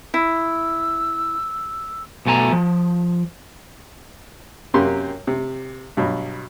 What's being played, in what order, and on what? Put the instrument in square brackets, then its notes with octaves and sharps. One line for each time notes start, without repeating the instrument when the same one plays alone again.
[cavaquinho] E4 [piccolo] E6
[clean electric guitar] B1 B2 A3 G#5 A#5
F3
[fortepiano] F#2 C3 A#3 G4 C6
C3
G2 B2 F#3